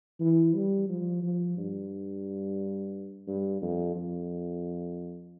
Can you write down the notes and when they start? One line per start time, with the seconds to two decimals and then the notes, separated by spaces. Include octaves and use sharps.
0.20 E3
0.54 G3
0.89 F3
1.23 F3
1.57 G2
3.27 G2
3.62 F2
3.96 F2